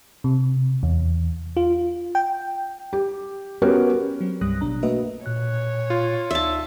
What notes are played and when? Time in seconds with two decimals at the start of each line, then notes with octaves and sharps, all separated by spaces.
0.24 C3
0.83 E2
1.57 F4
2.15 G5
2.93 G4
3.62 B3 C#4 F#4 G4 A#4
4.21 F#3 C4
4.41 C2 G2 G3 D#6 F#6 A#6
4.61 A1 B2 D4 A#5
4.83 A3 A#3 F#4 B4 D#5 E5
5.26 A#2 C#5 F#6
5.90 F4
6.31 D2 D#4 D5 E5 A5